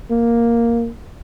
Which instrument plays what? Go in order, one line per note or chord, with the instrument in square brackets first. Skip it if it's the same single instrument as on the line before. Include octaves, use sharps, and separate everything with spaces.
[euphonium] A#3